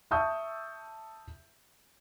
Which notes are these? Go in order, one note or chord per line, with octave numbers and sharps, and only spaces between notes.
E5 A5 C#6 D#6 E6 G6